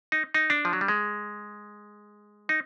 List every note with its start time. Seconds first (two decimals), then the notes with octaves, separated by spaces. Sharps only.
0.12 D#4
0.34 D#4
0.50 D4
0.65 F3
0.73 F#3
0.81 G3
0.88 G#3
2.49 D#4